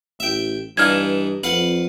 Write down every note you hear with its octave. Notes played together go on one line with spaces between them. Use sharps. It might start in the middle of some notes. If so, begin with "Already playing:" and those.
A1 E5 G5
G2 E3 D4 D#4 F5 F6 G#6
F2 B4 F5 F#5 F#7